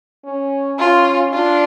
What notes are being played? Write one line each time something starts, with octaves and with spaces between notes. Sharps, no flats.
C#4
C#4 F4
D4 F4